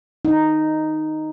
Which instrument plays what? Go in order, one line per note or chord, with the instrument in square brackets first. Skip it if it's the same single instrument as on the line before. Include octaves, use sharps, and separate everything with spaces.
[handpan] D#4